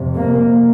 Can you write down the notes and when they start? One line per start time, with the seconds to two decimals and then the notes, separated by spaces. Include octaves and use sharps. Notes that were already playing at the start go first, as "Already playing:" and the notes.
Already playing: F2 C3
0.15 A#3